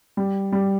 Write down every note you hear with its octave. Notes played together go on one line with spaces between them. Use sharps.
G3
G3